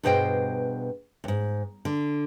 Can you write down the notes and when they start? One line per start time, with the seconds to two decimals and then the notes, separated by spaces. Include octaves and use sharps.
0.03 G2 B2 G#4 C5 D#5 G5
1.24 D#2 G#2
1.85 D3